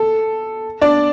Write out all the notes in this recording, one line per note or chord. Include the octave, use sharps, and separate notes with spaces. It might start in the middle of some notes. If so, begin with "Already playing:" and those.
Already playing: A4
D4 D5